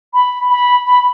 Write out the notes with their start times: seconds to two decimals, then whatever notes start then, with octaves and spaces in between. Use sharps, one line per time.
0.14 B5
0.50 B5
0.87 B5